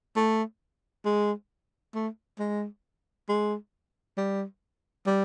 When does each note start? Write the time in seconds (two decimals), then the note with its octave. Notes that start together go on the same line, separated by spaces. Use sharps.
0.16 A3
1.05 G#3
1.94 A3
2.39 G#3
3.29 G#3
4.17 G3
5.06 G3